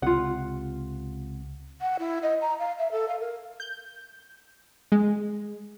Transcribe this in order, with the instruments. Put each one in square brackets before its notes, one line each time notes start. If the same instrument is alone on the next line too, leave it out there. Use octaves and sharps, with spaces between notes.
[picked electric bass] C#2 C3 [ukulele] F4 F#5
[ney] F#5
E4
D#5
A#5
F5
E5
A4
F5
A#4
[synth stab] G6
G#3